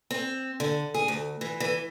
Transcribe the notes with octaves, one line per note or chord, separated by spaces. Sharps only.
C4
D3
G#4
D2
E3
E3